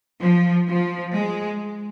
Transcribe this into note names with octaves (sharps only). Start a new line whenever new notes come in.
F3
F3
G#3